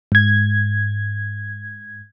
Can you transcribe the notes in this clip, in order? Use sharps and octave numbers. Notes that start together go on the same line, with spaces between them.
G#2 G#6